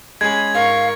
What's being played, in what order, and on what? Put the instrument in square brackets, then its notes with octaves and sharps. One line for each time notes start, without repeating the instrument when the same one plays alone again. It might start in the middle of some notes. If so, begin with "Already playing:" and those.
[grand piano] G#3 C#4 G#4 [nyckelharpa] B5 [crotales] G#6
[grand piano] G#2 [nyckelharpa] A#4 C#6 [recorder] F5